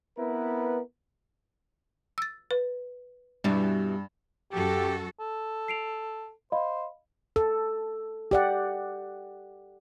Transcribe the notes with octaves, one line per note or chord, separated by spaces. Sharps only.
B3 C4 E4 A#4 B4
E6 A6
B4
G2 B2 E3 G3
F#2 F#4 G4 A4
A4
C7 D7 F7
C5 D#5 F5 B5
A4
G4 D5 F#5